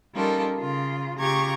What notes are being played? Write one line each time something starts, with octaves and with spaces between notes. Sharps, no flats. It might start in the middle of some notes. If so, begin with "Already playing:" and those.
G3 C#4 D#4 F4 A4 A#4
C#3 F4
C#3 F4 G4 A#5 C#6 G#6